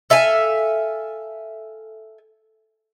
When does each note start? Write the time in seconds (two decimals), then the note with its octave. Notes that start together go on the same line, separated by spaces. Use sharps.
0.10 A4 E5 F5 G#5